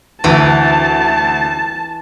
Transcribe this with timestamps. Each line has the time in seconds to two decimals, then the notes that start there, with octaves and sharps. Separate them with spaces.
0.24 D2 E3 A5